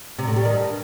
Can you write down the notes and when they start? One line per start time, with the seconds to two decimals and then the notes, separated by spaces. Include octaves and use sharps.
0.19 C3
0.27 A2
0.36 G3
0.45 D#3
0.54 G2